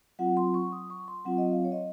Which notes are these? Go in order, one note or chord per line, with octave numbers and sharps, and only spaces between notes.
F#3 C4 F4 F#5
C6
C#6
D#6
C#6
C6
F#3 C4 F4 F#5
D#5
F5
C#5
D#5